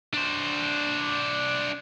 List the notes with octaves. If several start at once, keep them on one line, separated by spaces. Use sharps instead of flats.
D4 C5